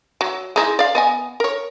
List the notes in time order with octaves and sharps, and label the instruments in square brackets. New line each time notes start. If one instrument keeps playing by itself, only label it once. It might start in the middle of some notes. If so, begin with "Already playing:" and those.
[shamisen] F#3
G#3 D#4 E4
D5 F5
B3 D#5 G#5
A#4 C#5